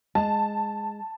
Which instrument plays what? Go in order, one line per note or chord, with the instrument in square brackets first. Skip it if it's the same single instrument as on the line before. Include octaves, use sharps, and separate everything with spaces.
[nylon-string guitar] G#3 [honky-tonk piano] A5